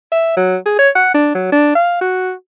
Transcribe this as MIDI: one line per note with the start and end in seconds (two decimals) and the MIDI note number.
0.12 0.37 76
0.37 0.56 54
0.66 0.74 68
0.79 0.90 73
0.96 1.12 78
1.14 1.31 62
1.35 1.48 54
1.52 1.74 62
1.75 2.00 77
2.01 2.32 66